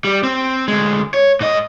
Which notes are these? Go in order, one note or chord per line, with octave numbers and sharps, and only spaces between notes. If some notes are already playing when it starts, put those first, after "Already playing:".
G3
C4
D2 G#3
C#5
G#2 D#5